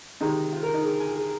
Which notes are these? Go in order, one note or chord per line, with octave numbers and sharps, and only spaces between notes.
C3 D#3 G#3 D#4
F4
A#4
D#4
G#4
G#5
G#4